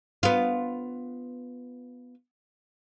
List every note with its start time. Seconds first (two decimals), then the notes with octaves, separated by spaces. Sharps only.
0.23 B3 F4